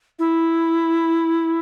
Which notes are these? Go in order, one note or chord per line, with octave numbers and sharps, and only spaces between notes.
E4